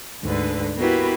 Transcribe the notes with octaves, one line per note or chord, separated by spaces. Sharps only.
D2 G#2 D3 B4
A#3 B3 E4 F#4 G4 B4